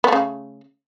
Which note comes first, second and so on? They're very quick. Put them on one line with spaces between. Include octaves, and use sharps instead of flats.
B3 A3 C#3